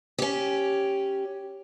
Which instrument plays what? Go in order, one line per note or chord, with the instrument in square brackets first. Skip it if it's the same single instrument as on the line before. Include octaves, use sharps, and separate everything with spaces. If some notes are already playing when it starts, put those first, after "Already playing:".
[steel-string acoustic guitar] C#4 G4